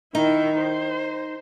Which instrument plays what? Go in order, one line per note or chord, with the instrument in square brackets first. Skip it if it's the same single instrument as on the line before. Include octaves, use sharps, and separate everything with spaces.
[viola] D#3 E4 [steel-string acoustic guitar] D#4
[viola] C5